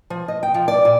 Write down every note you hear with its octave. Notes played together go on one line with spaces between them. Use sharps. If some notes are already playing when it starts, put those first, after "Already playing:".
F3
D#5
G5
F3
D5
A#2